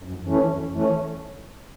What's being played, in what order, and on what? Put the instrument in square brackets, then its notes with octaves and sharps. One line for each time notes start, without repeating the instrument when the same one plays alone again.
[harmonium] F#2
E3 A3 C#4
F#2
E3 A3 C#4